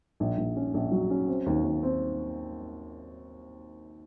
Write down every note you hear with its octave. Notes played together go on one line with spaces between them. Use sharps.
A#1
A#1
C#4
A#1
F#3
C#4
C4
D#2
D#2
C4